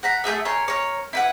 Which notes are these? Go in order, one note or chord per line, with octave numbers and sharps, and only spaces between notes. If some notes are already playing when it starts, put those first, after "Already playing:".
F#5 A#5 B5
A3 G4 G#4 E5
A#4 C#5 G#5 C6
A#4 C#5
E4 B4 F#5